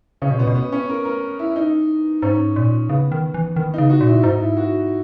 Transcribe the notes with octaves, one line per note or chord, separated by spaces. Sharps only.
C#3 C#4
B2
A#2 B3
B2
B3
C#4
A#4
A#4
E4
D#4
G#2 C#4
A#2
C#3 B3
D#3
E3
D#3 B3
C#3 D#4
F#4
A#2
E4
G#2 D#4
E4
F#4